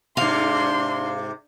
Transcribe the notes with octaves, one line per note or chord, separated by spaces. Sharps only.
G#2 C3 D4 F5 C6